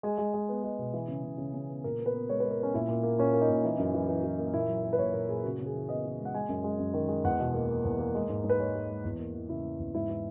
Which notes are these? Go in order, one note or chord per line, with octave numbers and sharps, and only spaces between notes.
G#3 G#4
G#3
G#3
B3
G#3
B2
E3
C#3
C#3
C#3
C#3
B3
A#2 A#4
B3
B4
B3
G#3 C#5
G#3 B4
A#4
B3 C#4
A#2 E4
A#2
A#3
A#2 C#4
A#3
D#4
A#2
E3
F#2
E3
E3
E3
A#3
A#2 E4
F#3
A#3
B4
A#2 C#5
A#2 A#4
A#2 G#4
C#3 F#4
C#3
G#4
E3
B3 D#5
E3
G#3
F#5
G#3 G#5
F#2
G#3
F#2
D#3
G#3
E2 F#5
B2
A#3
A#3
E2
A#3
G#3
G#2
G#2
B4
G#3 C#5
G#3
G#3
E2
A#3
E3
C#3 E4
E3
E2
G#2 E4
E3